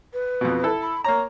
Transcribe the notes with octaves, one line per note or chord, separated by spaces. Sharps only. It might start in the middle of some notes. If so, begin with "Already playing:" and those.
B4
F2 B2
E4 A4
B5
A#3 C#5 A#5